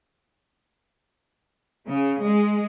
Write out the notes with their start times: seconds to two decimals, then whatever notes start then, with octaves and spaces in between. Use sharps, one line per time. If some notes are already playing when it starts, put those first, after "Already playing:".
1.88 C#3
2.24 G#3